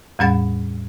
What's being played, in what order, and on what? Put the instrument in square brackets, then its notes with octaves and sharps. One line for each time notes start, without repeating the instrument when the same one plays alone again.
[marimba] E2 A2 G3 C#4 F#5 A6